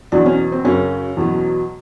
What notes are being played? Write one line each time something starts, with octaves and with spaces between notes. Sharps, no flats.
E2 B2 F#3 D4
C#4
C4
F#2 C#3 F#3 C#4
E2 B2 F#3